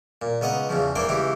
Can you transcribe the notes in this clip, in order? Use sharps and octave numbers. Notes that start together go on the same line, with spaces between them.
A#2
C#2 B3 D#5 F#5 A#5
E2 C#3 F3
E3 A#3 D4 C5 G5 D6
C#2 E3 E4 G4